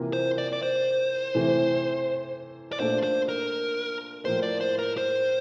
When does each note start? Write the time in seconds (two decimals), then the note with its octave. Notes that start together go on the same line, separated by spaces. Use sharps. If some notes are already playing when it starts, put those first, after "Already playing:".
Already playing: C3 E3 A#3 F4
0.13 C5
0.38 D5
0.53 D5
0.63 C5
1.35 C3 E3 A3
2.73 D5
2.80 A#2 A3 D4 F4 A4 C5
3.03 C5
3.29 A#4
4.25 A2 F3 A#3 C5
4.43 D5
4.61 C5
4.79 A#4
4.97 C5